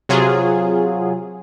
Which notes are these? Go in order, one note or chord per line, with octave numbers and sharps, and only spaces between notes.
C3 F#3 F4 G#4